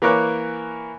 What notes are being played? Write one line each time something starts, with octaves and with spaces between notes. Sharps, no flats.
E3 A#3 A#4 C#5 D6 F#6